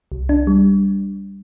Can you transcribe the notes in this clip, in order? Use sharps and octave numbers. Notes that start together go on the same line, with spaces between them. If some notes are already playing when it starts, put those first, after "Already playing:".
C2
D4
G3